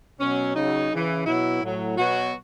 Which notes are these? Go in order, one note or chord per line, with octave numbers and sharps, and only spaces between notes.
B2 F#3 C#4
C#3 F#3 D#4
C#3 E3
B2 F#3 E4
A2 F#3
B2 F#3 F#4